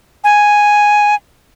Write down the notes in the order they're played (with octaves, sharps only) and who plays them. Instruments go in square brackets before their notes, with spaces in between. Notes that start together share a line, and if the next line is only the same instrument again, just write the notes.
[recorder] G#5